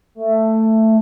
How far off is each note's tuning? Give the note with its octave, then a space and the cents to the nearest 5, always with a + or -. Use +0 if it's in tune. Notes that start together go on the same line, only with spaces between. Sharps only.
A3 +10